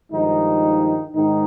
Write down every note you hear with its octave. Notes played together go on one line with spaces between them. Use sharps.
G2 D#3 F3 G#3 D#4
G#2 D#3 D#4